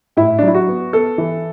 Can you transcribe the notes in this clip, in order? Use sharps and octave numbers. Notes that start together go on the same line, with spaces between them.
A2 E4
D4
F#3 E4
F#4
B3
B3 A4
E3